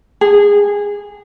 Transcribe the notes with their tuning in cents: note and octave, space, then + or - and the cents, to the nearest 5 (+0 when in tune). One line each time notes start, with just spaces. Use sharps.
G#4 -20